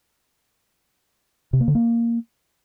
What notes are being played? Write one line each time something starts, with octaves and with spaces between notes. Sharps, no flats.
C3
A#3
D3
A#3